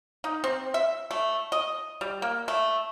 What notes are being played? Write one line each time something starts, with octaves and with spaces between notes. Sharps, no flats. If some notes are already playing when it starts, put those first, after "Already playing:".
D#4
C4
E5
A3
D#5
G3
A#3
A3